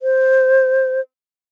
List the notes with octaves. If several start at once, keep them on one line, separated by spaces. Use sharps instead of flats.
C5